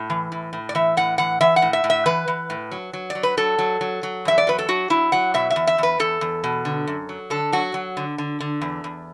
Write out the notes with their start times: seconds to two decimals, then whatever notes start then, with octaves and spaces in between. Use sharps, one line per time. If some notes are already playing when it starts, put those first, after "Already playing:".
Already playing: A2
0.10 E3
0.32 A2
0.53 A2
0.69 D5
0.75 E3 E5
0.97 A2 F#5
1.18 E3 F#5
1.41 E3 E5
1.56 F#5
1.62 A2
1.73 E5
1.84 A2
1.90 E5
2.06 E3 B4
2.28 E3
2.50 A2
2.71 F#3
2.93 F#3
3.10 D5
3.15 F#3
3.23 B4
3.37 F#3 A4
3.59 F#3
3.81 F#3
4.03 F#3
4.25 E2 E5
4.38 D5
4.47 F#3 B4
4.59 A4
4.69 F#3 F#4
4.90 F#3 E4
5.12 F#3 F#5
5.34 B2 E5
5.50 E5
5.56 E2
5.67 E5
5.78 E2 B4
5.99 E2 A4
6.21 E2
6.44 B2
6.65 D3
6.87 F#2
7.09 F#3
7.30 D3 A4
7.52 F#3 F#4
7.74 F#3
7.97 D3
8.18 D3
8.40 D3
8.62 E2
8.84 E2